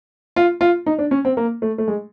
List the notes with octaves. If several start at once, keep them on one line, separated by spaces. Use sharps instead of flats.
F4
F4
D#4
D4
C#4
C4
A#3
A3
A3
G#3